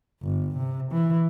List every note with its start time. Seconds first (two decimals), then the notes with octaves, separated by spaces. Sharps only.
0.22 G1
0.57 C3
0.92 E3